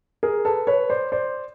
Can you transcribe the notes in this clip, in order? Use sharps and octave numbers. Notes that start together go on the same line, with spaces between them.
G#4 A#4
A4 B4
B4 C#5
C5 D5
C5 D5